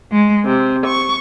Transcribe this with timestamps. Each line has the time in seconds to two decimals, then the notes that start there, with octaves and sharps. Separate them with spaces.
0.11 G#3
0.46 C3
0.86 C#6